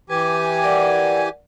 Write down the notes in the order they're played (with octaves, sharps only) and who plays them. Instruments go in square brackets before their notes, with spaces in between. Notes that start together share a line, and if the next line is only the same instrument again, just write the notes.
[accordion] E3 G4 G#5 [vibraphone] B4
[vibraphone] A#4 D5 F#5